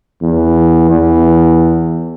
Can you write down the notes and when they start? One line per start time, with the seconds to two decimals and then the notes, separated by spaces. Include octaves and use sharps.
0.22 E2
0.90 E2